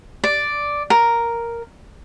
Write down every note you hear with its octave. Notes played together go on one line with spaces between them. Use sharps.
D5
A#4